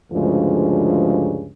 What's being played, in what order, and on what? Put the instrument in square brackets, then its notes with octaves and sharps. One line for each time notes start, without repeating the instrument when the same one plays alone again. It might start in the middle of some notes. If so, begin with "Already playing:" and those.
[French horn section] D2 G2 C#3 F3 G#3